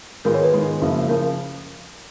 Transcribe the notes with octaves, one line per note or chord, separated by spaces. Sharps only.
G#2 D#3 G#3 B3 F4 A#4
C#5
B4
G#2 D#3 G#3 B3 F4
F#1 F#2 C#3 F3
C#3 F3 A#4